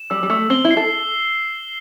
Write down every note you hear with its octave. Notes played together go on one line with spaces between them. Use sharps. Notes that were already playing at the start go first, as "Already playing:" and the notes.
Already playing: E7
G3 E6
G3
A3 E6
C4 G7
E4
C7
A4